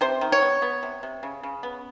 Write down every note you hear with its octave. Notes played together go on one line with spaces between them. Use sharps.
C3 C5
D#3
C#5
B3
B3
C3
C3
C#3
C#3
B3